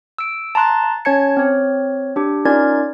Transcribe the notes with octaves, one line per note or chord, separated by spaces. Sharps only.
E6 D7
A5 A#5 C6 F#6 A6
C#4 C#5 A5 G#6 C#7
C4 C#5
D4 G4
C#4 D#4 F4 A#4 D5 G#6